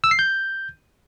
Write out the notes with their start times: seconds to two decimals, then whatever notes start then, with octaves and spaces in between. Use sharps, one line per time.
0.04 E6
0.11 C7
0.19 G6